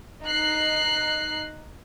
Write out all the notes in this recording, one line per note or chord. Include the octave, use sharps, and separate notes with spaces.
D#4 F#6 C7